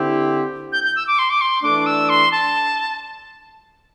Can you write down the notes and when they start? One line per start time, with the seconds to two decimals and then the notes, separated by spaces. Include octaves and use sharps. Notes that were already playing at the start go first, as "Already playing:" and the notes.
Already playing: D3 C4 E4 G4
0.72 G6
0.84 G6
0.96 E6
1.07 D6
1.19 C6
1.30 D6
1.41 C6
1.63 E3 A3 D4 D6
1.86 E6
2.09 C6
2.32 A5